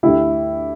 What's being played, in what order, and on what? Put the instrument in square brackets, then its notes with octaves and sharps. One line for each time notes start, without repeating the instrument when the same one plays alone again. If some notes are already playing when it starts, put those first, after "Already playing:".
[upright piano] D2 D3 A3 E4 G4